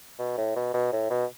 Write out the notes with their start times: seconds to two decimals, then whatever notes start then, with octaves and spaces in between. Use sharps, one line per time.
0.19 B2
0.38 A2
0.56 B2
0.74 B2
0.92 A2
1.10 B2